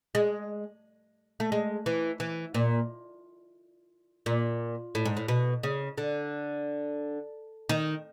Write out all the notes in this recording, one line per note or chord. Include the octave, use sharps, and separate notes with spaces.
G#3
A3
G#3
E3
E3
A#2
A#2
A2
G#2
A2
B2
C#3
D3
D#3